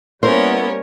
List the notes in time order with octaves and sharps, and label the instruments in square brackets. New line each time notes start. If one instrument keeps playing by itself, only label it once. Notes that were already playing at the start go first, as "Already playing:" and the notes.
[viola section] G3 A#3 C#5 [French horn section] B3 E4 [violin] C#4 A#4 [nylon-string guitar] C5